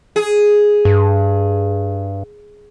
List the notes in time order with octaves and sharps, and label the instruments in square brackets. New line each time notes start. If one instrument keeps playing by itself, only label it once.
[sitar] G#4
[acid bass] G2